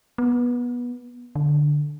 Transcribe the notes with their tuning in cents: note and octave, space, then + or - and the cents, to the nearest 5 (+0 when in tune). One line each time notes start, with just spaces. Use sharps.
B3 -20
D3 +5